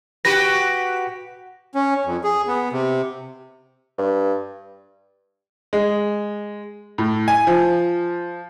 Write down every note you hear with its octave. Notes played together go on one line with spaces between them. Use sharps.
F#4 G4 B4 A#6
C#4
F2
G#4
B3
C3
G2
G#3
A2
G#5
F3